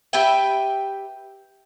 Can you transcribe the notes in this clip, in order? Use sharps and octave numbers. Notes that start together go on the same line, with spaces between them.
G4 B4 E5 G5